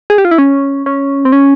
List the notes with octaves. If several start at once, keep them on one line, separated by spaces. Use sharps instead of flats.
G#4
G4
F4
E4
C#4
C#4
C4
C#4